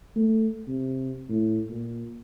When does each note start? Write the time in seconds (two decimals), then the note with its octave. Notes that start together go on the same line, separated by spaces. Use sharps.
0.16 A3
0.68 C3
1.29 A2
1.70 A#2